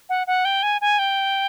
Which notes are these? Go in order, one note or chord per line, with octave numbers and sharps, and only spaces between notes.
F#5
F#5
G5
G#5
G#5
G5